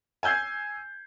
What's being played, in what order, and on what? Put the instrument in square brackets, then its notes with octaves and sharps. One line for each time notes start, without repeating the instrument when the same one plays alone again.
[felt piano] G#5 E6 G6 G#6 C7